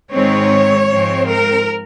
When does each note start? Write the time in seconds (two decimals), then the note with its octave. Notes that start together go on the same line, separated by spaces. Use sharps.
0.11 G#2 D#3 G#3 C4 C#5
0.88 G#2 F3 G#3 C4
1.27 A#4